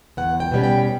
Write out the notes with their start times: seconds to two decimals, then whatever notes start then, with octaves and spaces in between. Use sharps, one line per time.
0.17 E2 F#5
0.40 G5
0.51 B2 G3 C#4
0.63 G5